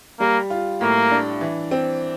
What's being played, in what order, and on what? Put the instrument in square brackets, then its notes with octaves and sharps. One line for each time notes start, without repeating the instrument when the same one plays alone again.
[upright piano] G3 [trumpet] A#3
[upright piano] F4
[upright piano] A2 [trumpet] A#3
[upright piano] D4
E3
C4